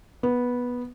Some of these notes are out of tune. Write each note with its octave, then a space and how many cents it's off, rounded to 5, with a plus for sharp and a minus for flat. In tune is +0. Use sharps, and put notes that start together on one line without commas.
B3 -10